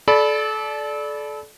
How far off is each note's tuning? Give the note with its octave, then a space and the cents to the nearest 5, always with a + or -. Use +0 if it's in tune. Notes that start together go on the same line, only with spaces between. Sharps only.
A4 -30 D5 +0 B5 +0